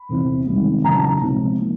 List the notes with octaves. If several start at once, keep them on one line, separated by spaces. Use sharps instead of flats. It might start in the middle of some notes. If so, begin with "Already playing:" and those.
Already playing: B5
E2 C3 E3
C2 C3 D#3 G#3
F#2 C#3 E3 A#5
A5
A#5
C#2 C3 F3 G#3
F3 A#3